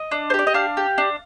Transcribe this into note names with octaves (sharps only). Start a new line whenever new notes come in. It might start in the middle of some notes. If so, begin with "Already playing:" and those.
Already playing: D#5
D4
C5
G4 D5
D#5
D4 F5
G4
D4